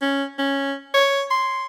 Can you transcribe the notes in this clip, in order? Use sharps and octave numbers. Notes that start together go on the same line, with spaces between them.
C#4
C#4
C#5
C6